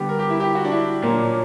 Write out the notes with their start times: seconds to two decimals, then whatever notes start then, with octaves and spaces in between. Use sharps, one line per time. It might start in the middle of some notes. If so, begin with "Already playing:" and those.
Already playing: D3 G3 B3 G4
0.09 A#4
0.19 G4
0.30 E4
0.40 G4
0.55 F#4
0.65 D4
0.72 E4
1.02 A#2 F#3 A#3 C#4
1.13 D4
1.23 C#4